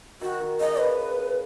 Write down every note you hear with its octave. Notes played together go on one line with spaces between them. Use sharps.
D#3 F#4
D#3
C#3 D#5
B4